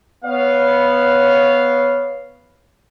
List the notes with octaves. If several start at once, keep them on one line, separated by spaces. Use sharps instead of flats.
B3 C#5 F5